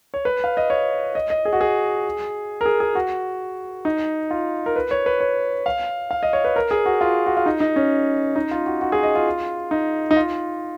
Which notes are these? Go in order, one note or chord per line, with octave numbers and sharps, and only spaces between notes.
C#5
B4
F5
D#5
C#5
D#5
D#5
G#4
F#4
G#4
A#4
G#4
G#4
F#4
D#4
F4
A#4
B4
C#5
B4
C#5
F5
F5
D#5
C#5
B4
A#4
G#4
F#4
F4
F#4
F4
D#4
D#4
C#4
D#4
F4
F#4
F#4
G#4
D#5
F4
D#4
D#4
F4